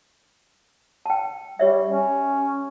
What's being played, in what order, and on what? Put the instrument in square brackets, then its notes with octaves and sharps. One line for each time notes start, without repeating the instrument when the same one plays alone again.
[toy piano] G5 A5
[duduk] G3 [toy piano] G4 C#5 E5
[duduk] C#4